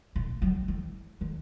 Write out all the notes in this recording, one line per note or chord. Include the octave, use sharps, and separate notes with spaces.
A#2
F#3
E3
D#3